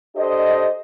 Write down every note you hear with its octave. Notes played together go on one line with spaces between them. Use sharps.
D4 G4 A4 C5 D#5